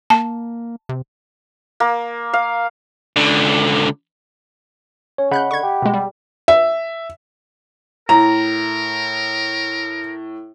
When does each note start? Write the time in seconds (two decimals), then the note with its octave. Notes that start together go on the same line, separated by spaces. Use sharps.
0.10 A#3 A5
0.89 C3
1.80 A#3
2.33 F5
3.16 C#2 D3
5.18 C#4 C#5
5.31 C#3 D#5 F#5 B5 F#6 G6
5.51 D3 C#6 G#6
5.63 G4
5.82 B2 G#3
5.94 G3
6.48 E5
8.09 A2 A#4 A#5